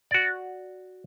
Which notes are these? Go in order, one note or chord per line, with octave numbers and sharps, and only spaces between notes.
F#4 D5